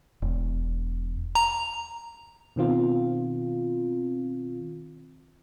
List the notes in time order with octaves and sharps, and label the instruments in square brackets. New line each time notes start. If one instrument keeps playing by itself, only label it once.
[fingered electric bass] E1
[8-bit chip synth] A#5
[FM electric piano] B2 D#3 C4 F4